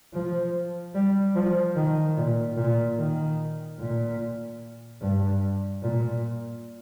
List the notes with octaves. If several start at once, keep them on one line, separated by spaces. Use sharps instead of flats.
F3
G3
F3
D#3
A#2
A#2
D#3
A#2
G2
A#2